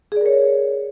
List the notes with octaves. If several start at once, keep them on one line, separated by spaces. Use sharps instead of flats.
G#4 A#4 C#5 D5